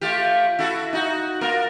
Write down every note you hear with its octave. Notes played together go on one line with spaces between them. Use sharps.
A3 F4 G4
E4 F#4 A4
D#4 F#4
A#3 F4 A#4